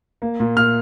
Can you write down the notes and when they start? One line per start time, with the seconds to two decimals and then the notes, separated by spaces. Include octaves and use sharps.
0.22 A#3
0.40 A#2
0.57 A#2 F6